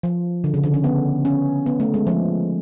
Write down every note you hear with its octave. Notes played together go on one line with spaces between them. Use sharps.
F3
D3
C#3
D3
C#4
B3
C#4
B3
A3
G#3
F3